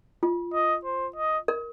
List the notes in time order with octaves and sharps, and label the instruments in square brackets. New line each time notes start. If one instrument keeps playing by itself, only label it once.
[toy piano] F4
[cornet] D#5
C5
D#5
[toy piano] A#4